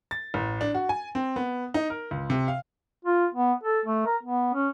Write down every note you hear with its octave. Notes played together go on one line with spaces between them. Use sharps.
A6
A1
D4
F#4
G#5
C4
B3
D#4
A#4
C#2
C3
F5
F4
B3
A4
A3
A#4
B3
C#4